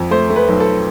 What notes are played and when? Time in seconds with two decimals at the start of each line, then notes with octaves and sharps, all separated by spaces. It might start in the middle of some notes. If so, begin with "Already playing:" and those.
Already playing: F2
0.11 A3 C5
0.30 A3
0.36 B4
0.48 B1
0.60 A4